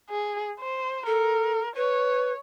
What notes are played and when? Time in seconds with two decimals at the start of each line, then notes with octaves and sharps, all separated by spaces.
0.10 G#4
0.60 C5
1.06 A4 A#4
1.76 B4 C#5